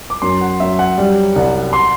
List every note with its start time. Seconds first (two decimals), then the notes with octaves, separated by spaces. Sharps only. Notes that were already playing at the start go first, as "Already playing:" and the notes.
0.10 D6
0.22 F#2 C6
0.41 F#5
0.60 F#2 E5
0.79 F#5
0.98 G3
1.36 C2
1.73 C6